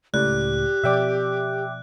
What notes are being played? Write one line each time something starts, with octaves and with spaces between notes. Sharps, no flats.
C#2 A2 G4 D5 F#6
B2 F3 D5 E5 G5 D6